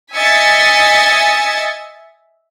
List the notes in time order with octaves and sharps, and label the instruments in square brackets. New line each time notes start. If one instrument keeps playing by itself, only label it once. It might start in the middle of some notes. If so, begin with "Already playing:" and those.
[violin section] D#5 E5 G#5 A6 B6 C#7